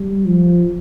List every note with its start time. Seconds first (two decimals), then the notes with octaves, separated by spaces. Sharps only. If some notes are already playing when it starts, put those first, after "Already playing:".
Already playing: G3
0.25 F3